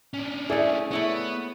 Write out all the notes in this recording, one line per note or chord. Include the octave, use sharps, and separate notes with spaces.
C#4 D4
A3 E4 G#4 D5
A3 B3 E4 C#5